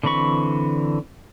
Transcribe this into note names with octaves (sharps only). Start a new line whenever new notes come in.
D3 E3 C4 B5 C#6